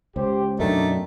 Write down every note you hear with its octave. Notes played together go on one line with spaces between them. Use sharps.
C#2 G4 C5
F#2 B2 D#3 A3 D4